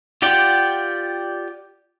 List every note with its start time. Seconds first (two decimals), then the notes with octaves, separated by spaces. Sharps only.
0.22 F4 G4 D5 F#5 G5